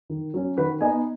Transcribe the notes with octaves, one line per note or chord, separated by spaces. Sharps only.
D#3
F#3 C#4
D#3 F#4 B4
B3 D#4 D#5 G#5